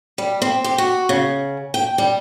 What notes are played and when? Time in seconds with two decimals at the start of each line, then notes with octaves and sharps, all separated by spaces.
0.18 G3
0.42 C4
0.64 G4
0.78 F#4
1.09 C#3
1.74 G5
1.98 G3